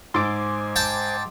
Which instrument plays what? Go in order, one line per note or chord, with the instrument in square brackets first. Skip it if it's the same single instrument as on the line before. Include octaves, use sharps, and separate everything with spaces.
[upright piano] G#2 E6 A6 [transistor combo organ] C5 G#5 [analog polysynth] C6 D6
[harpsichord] G5 A5